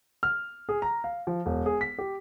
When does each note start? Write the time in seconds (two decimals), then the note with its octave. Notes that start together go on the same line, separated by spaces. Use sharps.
0.23 F6
0.69 G#4
0.82 A#5
1.04 F5
1.27 F3
1.46 E1
1.66 G#4
1.81 B6
1.98 G4